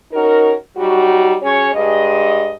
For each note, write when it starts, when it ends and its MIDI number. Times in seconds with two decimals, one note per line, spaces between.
0.13 0.54 61
0.13 0.54 63
0.13 0.54 66
0.13 0.54 70
0.77 1.35 54
0.77 1.35 55
0.77 1.35 63
0.77 1.35 66
1.43 1.69 54
1.43 1.69 61
1.43 1.69 68
1.43 1.69 73
1.74 2.53 43
1.74 2.53 56
1.74 2.53 75